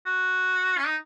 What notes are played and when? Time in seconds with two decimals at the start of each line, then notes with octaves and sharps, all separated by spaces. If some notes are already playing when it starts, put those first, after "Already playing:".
0.06 F#4
0.78 C#4
0.87 D#4